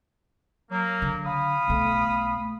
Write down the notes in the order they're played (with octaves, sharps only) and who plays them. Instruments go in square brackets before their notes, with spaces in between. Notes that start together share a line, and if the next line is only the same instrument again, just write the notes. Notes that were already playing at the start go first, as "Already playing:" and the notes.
[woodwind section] F#3 A#3
[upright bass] D3
[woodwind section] F5 B5 D#6
[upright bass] B1 A3